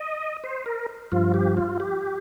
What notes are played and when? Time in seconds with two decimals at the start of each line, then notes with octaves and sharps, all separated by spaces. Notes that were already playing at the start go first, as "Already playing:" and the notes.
Already playing: D#5
0.44 C5
0.66 A#4
1.12 G2 F3 F4
1.34 G4
1.57 F4
1.80 G4